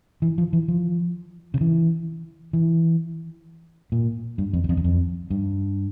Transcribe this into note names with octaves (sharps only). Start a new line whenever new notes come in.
E3
F3
E3
F3
C#3
E3
E3
A#2
G2
F2
E2
F2
E2
F2
G2